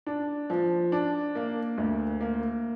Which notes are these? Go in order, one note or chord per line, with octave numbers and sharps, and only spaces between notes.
D4
F3
D4
A#3
D2
A#3